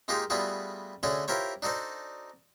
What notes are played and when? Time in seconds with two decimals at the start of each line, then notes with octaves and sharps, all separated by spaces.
0.08 G#3 A#3 D#4 F4 G4 G#4
0.30 G3 A3 B3 F4 F#4 G#4
1.03 D3 A3 C#4 F#4 G#4
1.28 E4 F4 G4 A#4 C5 C#5
1.62 D4 D#4 F#4 A4 C5